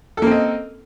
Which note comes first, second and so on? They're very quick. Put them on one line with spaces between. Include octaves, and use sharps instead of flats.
A4 A#3 C4 D#5